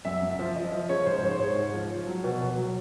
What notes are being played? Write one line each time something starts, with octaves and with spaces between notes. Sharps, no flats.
F#2 E5
F#2
E5
F3
F3 D#5
F3
C#3 C#5
G#2 C5
C5
G#2 C#5
C5
G#2 C#5
G#2
F3
F3
F#3
B2
B2
F#3